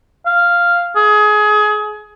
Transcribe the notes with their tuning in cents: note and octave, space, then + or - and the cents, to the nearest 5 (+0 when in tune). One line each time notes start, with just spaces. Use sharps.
F5 -5
G#4 +25